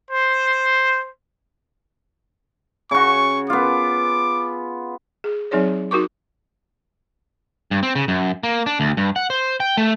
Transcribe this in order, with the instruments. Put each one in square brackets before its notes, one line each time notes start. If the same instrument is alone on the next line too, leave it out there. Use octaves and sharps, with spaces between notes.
[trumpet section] C5
[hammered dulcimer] C#3 F#4 [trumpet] C#6
[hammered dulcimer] B3 F4 [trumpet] D6
[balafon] G#4
F#3 C4 D#4 G#4 C#5 D5
D#4 F#4 A#4 C#6 D6
[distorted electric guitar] G2
C4
C#3
F#2
A#3
D4
D2
G2
F#5
C5
G5
A3